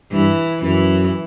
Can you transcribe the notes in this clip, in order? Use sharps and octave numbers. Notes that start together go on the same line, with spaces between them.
G2 E3
F#2 E3